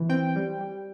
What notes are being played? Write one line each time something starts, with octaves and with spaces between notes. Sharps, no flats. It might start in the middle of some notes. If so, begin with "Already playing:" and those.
Already playing: E3
C4 G5
G3
G3